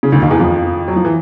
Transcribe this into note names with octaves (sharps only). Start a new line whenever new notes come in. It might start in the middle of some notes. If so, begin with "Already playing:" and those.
C#3
D2 D3
D#2 D#3
E2 E3
F2 F3
F#3
F3
E3